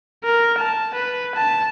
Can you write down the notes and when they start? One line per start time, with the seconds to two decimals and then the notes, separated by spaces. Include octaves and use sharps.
0.24 A#4
0.58 A5
0.95 B4
1.35 A5